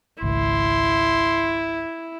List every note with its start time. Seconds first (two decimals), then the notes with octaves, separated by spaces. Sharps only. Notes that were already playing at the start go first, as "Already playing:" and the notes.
0.22 G#1 C#2 E4 C6